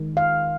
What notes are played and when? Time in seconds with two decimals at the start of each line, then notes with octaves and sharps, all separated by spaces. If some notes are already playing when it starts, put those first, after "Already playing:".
Already playing: D#3 G#3 D#4
0.17 F5